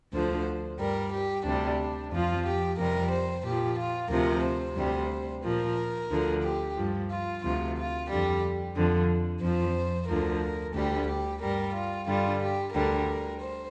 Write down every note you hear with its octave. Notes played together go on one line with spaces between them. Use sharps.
D2 D3 F3 C5
G2 G3 A#4
G4
D2 C3 G3 D4
F2 F3 F4
G4
F2 C3 G3 A#4
C5
A#2 F3 G4
F4
D2 C3 F3 A#4
C5
D2 C3 G3
A#2 F3 A#4
D2 D3 F3
G4
G2 F3
F4
D2 C3 F3 F4
F4
F2 D3 G3 G4
F2 D3 F3
F2 F3 C5
D2 D3 F3 A#4
D2 D3 G3 G4
G4
G2 G3 A#4
F4
G2 D3 G3 F4
G4
D2 D3 G3 A#4
C5